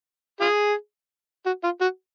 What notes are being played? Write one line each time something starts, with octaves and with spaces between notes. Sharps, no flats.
F4 G#4
F#4
F4
F#4